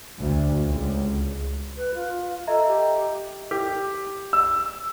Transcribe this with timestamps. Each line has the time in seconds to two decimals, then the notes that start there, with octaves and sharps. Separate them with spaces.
0.20 D2
0.65 C#2
1.77 B4
1.95 F4
2.47 A4 D#5 E5 A#5
2.67 G4
3.51 G4
4.33 E6